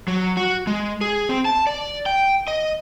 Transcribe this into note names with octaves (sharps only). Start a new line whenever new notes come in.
F#3
F#4
G#3
G#4
C4
A5
D5
G5
D#5